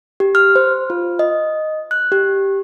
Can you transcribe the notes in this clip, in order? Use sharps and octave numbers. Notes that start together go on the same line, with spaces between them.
G4
F6
C5
F4
D#5
F#6
G4